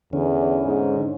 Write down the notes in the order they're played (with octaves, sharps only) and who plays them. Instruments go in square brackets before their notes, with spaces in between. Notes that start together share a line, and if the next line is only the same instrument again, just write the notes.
[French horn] E2 [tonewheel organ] D3 C#4
[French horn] G#2